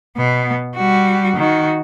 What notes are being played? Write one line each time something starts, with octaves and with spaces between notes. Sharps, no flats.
B2 B3
G3 F#4
D#3 F#4